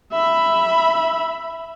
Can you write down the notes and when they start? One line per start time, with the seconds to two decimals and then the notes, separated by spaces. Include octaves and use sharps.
0.12 E5 B5